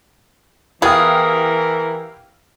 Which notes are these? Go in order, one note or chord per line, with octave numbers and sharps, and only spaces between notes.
E3 B3 E4 G4 G#4 A#4 F5